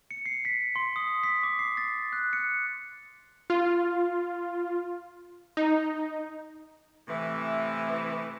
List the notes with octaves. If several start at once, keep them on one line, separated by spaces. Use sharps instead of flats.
C#7
C7
B6
C6
D#6
B6
D6
C7
A6
F#6
C#7
F4
D#4
A2 C3 E3